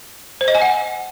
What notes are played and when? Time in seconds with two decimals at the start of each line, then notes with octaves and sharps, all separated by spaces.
0.41 C5
0.48 D#5
0.55 G#5
0.62 F#5